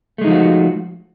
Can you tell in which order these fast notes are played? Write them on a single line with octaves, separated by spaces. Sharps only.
A3 G#3 D#4 F3 F#4